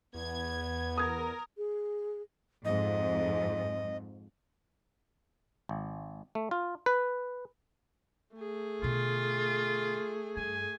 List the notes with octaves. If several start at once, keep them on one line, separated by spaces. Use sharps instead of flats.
E2 B3 G#6
A#4 D#6 G#6
G#4
F2 G#2 D#5
G#1
A3
F4
B4
A3 G#4
B2 D3 F4
G2 G#5